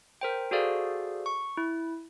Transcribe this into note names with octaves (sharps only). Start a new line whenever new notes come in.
A#4 C5 G5
F#4 G#4 A4 C5 D5 F5
C#6
E4